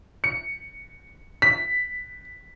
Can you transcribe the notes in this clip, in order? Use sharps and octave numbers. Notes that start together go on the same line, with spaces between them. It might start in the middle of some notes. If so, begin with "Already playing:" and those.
C#7
B6